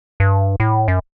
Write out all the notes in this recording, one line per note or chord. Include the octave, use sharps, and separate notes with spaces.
G2
A2
F#2